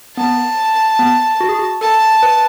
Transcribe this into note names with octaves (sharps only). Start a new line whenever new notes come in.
B3 A5
B3
F#4
G#4
F#4
A4 A5
B4